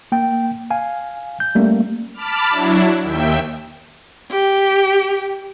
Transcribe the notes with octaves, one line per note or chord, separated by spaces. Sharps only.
A#3 G5
F5 G#5
G6
G3 A3 A#3 C#4
A5 B5 D6 F6
F#3 D4 E4
D#2 E5 G5
G4